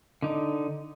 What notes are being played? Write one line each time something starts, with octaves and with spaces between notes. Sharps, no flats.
D3 D#4